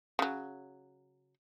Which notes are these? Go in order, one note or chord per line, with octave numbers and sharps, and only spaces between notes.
C#3 F#3